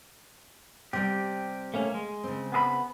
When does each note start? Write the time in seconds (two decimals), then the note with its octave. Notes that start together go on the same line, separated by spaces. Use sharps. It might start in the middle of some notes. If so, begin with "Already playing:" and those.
0.93 C3 G3 G4
1.74 A3 A#3 C#4
1.94 G#3
2.24 C#3 C4
2.52 B3 G#4 B5